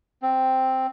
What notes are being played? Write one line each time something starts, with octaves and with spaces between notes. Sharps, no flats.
C4